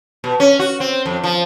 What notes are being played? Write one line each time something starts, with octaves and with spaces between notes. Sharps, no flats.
B2
C#4
F#4
C4
F2
F3